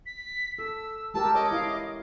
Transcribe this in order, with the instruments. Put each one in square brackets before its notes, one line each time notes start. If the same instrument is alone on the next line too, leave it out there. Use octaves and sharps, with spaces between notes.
[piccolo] B6
[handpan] A4 [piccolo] E6
[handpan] G#3 G4 A#4 [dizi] A5 [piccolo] E6
[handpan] C#5 [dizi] D#5 [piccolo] D6
[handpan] E4 F5